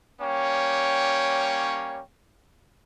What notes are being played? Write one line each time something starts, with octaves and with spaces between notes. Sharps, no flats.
G3 A#3 C#4 C#5 G5